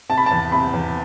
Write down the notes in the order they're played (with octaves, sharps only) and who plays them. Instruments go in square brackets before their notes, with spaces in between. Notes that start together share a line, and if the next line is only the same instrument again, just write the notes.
[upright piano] C3 [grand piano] A5
[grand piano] B5
[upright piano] E2 [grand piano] A5
[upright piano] C3 [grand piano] B5
[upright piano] E2